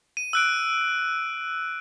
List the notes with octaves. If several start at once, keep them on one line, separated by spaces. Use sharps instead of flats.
D#7
E6 F#6 D7